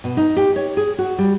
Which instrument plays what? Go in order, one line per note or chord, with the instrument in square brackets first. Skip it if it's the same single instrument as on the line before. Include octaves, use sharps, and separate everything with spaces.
[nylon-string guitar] B2
D#4
G4
C#5
G#4
F#4
G3